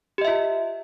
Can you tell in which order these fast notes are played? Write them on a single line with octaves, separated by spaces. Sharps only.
G4 D#5 E5 F4